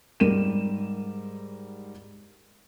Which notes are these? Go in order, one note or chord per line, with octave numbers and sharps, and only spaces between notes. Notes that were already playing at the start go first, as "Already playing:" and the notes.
G#2 G3 G4 A#4 D#7 E7